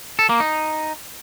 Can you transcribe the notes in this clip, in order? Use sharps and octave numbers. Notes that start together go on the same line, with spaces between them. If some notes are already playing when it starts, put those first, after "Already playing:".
A4
A#3
D#4